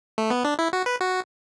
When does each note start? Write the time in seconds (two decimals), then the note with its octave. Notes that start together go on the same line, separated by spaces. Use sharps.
0.18 A3
0.30 B3
0.45 D4
0.59 E4
0.73 F#4
0.86 B4
1.01 F#4